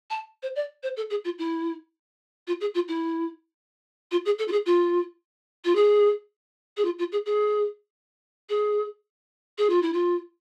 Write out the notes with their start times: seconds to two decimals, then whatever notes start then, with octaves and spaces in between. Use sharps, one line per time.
0.10 A5
0.43 C5
0.56 D5
0.83 C5
0.97 A4
1.10 G#4
1.24 F4
1.38 E4
2.47 F4
2.61 G#4
2.75 F4
2.88 E4
4.11 F4
4.25 G#4
4.39 A4
4.48 F4
4.52 G#4
4.66 F4
5.65 F4
5.75 G#4
6.77 G#4
6.85 F4
6.99 F4
7.12 G#4
7.26 G#4
8.49 G#4
9.58 G#4
9.70 F4
9.82 E4
9.93 F4